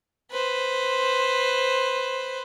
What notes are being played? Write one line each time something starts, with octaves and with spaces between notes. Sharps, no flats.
B4 C5